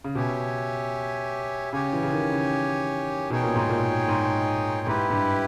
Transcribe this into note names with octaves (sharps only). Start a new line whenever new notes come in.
C#3
B2 G4 C#5 E5 G#5
C#3 G4 C#5 G#5
E3
C#3
D#3
C#3
B2 D#4 G#4 C#5 G5
A#2
G#2
A#2
G#2
G#2 E4 G4 B4
G#2
G2